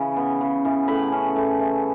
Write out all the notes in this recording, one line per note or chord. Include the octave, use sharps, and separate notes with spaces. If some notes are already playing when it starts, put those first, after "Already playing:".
Already playing: C#3 E3
B3
C#3
E3
A2 B5
C#4
A2
E3